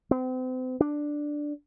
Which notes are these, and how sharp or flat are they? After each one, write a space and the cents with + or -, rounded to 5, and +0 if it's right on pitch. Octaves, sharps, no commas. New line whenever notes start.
C4 -40
D4 +5